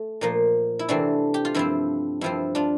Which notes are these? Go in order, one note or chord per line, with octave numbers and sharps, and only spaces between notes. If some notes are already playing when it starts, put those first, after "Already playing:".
Already playing: A3
A#2 F3 A#3
E4
C3 E3 A3 C4 D4
G4
F4
G2 F3 C4 E4
G2 F3 C4 E4
D4 F4